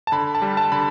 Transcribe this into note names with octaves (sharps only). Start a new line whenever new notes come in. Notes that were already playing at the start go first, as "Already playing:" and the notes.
A5
D3 B5
A5
G3
A5
D3 B5